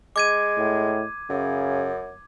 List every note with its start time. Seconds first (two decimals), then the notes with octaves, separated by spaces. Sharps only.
0.16 G#3 D6 G#6 D#7
0.58 A2
1.30 F#2 C#3